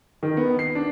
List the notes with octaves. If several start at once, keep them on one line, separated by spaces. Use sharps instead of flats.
D#3
B3
C7
D4